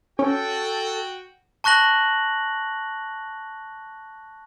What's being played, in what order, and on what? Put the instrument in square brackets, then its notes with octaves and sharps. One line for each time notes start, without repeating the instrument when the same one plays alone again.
[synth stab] C#4 [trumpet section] F#4 G5 [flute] A4
[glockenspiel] A5 C#6 F#6 A#6 F#7